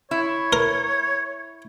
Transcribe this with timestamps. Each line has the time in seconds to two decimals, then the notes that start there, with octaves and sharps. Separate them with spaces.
0.11 E4 C#5
0.53 A#4